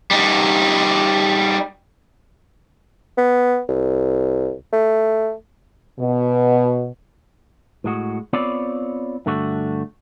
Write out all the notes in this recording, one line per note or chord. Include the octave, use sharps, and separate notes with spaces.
G3 D#4
B3
C2
A3
B2
A2 G#3 F#4
B3 C4 F4 C#5 D5
G2 D3 A3 F#4